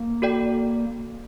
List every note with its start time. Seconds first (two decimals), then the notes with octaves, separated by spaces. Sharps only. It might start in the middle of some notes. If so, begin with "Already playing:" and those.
Already playing: A#3
0.22 F#4 A4 D5 G5